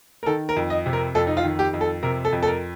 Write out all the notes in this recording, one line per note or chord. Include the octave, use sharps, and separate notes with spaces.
A#4
D#3 A4
A#4
F2
D#5
C3
A#4
F2 A4
D#4
F4
D#3
G4
F2
A4
C3 A#4
A4
F2
A4
A#4